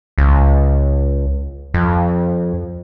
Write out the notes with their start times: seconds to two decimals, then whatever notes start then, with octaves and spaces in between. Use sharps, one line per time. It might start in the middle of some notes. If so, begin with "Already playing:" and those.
0.18 C#2
1.74 F2